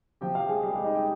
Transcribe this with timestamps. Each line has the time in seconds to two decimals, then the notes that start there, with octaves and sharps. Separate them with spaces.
0.21 C3 F3 G4 G5
0.35 F4 F5
0.49 G#3 G#4
0.63 G3 G4
0.73 G#3 G#4
0.84 D#4 D#5
0.95 G4 G5